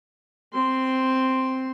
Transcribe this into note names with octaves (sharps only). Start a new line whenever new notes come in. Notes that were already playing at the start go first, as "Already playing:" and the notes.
C4 C6